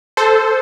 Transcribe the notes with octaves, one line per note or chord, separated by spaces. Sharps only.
A4 C5